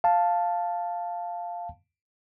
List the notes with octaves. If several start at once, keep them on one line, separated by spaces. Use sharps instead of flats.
F5 A5